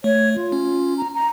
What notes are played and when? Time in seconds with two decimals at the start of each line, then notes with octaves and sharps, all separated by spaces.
0.04 A3 C#5
0.36 F4
0.52 C#4
0.98 A#5
1.14 A#5